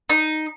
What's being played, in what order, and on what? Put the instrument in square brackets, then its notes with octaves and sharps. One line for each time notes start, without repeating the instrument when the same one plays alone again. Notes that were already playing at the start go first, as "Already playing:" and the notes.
[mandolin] D#4